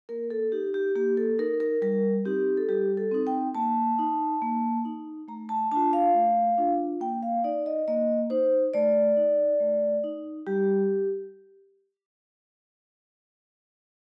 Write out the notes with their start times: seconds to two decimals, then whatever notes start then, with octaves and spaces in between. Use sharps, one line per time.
0.09 A#3 A#4
0.30 A4
0.52 D#4 G4
0.74 G4
0.95 A#3 G4
1.17 A4
1.39 D#4 A#4
1.60 A#4
1.82 G3 A#4
2.25 C4 D#4 G4
2.57 A4
2.68 G3 G4
2.97 A4
3.12 C4 D#4
3.27 G5
3.55 A#3 A5
3.99 D#4
4.42 A#3
4.85 D#4
5.28 A3 A#5
5.49 A5
5.71 D4 F4 A5
5.93 F5
6.14 A3
6.58 D4 F4
7.01 A#3 G5
7.23 F5
7.44 D#4 D5
7.66 D#5
7.88 A#3 D#5
8.30 D#4 C5
8.74 A3 D5
9.17 D#4
9.60 A3
10.04 D#4
10.47 G3 G4